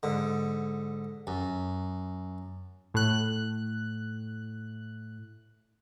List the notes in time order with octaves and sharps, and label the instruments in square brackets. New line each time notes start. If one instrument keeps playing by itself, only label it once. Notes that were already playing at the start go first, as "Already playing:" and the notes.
[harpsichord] G#2 D3
F#2
[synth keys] A2 F#6